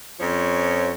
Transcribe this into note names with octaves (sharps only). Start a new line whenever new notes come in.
F2 F3 C#4 C#5